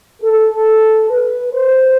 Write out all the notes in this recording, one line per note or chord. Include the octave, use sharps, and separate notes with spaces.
A4
B4
C5